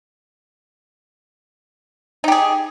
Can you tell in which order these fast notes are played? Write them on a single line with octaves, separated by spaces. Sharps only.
D#4 G4 G#4